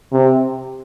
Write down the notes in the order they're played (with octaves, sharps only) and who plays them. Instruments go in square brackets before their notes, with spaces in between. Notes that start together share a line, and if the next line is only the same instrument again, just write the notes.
[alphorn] C3